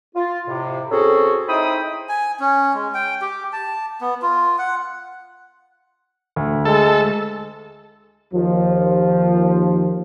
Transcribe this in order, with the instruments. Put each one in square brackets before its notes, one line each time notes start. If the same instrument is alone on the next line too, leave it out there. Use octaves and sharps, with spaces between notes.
[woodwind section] F4
F2 A2 C3
C4 C#4 F#4 G#4 A4
D#4 E4 C5 G5 B5 D#6
[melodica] G#5
C#4
G#3
G5
G4
A5
B3
F4
F#5
[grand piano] D2
[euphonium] G#3 [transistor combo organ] A4
[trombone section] D#2 F3